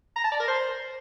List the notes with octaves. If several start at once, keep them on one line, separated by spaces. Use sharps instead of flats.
A#5
A5
D5
A#4
C5